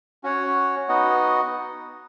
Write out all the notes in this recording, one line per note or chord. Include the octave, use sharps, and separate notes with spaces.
C#4 F#4 C#5 F#5
B3 D#4 F#4 D#5 F#5